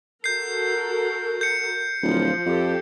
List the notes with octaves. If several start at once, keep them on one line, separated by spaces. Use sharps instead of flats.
F#4 A4 A#4 G6 C7
G6 C#7
D1 F3
F2 G4 A4